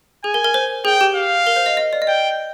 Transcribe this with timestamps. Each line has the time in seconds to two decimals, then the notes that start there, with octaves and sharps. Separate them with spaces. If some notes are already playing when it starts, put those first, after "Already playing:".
0.24 G#4 G#5
0.34 A#4
0.44 A#4
0.54 C5
0.85 G#4 G5
1.01 G4
1.16 F5
1.47 A#4
1.56 C5
1.66 D#5
1.77 D#5
1.93 D5
2.02 D#5
2.07 D5 G5